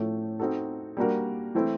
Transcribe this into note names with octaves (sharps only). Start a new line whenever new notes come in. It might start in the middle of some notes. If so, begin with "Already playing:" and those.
Already playing: A2 F3 A3 C#4
C4 D#4 F#4 A4
G3 A#3 D4 F#4 A#4
E3 A3 C4 E4